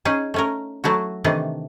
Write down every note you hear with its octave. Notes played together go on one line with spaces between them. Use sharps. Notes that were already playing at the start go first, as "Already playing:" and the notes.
C#4 D#4 G#4
A3 C#4 A#4
F#3 A3 E4 F#4
C3 D#3 E3 A3 D4